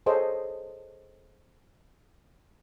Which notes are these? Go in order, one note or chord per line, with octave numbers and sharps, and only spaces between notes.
G#4 A4 C5 C#5 D#5